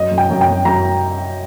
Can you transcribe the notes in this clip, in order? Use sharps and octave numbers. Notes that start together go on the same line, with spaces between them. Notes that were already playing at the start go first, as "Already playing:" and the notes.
Already playing: F#2 D#5
F#2
G5
F#2
G5
F#2
F#2 A#5